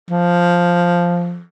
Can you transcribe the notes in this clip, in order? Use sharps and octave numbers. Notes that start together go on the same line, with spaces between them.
F3